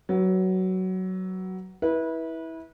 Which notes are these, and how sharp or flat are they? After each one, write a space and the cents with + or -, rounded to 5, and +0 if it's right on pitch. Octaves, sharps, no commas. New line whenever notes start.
F#3 +15 B4 +0
E4 -20 B4 -25